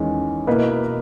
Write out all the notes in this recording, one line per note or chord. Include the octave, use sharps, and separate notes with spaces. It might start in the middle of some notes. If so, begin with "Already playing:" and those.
Already playing: E2 D#3 G#3 C#4
B2 A#3 E4 B4 D#5